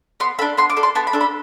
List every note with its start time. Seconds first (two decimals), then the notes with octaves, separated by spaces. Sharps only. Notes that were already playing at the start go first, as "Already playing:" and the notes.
0.20 B3 C6
0.39 A4 B5
0.42 D4
0.57 B3 C6
0.70 D6
0.77 D4 A4
0.83 C6
0.95 B3 A5
1.07 B5
1.13 D4 A4
1.21 B5